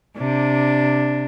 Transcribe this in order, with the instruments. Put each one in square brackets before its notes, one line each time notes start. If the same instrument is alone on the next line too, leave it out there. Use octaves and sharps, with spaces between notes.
[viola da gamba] C3 D4